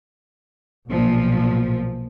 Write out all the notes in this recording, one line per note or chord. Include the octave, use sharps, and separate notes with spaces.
B1 A#2 F3